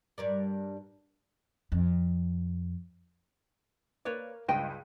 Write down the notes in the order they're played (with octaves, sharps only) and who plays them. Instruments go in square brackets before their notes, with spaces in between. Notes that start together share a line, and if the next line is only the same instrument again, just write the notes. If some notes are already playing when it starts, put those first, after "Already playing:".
[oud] G2 A#4 D5
[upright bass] F2
[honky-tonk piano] A#3 [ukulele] B4 C#5 D5
[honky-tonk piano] C#2 G2 D#7 [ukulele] F4 D#5 G5